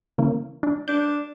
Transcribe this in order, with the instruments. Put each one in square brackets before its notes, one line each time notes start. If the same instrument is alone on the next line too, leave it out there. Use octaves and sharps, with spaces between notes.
[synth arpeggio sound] C#3 E3 A#3
D4
[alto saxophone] D4 [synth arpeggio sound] G6